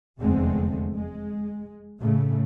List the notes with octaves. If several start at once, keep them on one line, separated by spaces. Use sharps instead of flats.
F1 E2 D3 G#3 A3 C4
G#3
A2 C#3 A3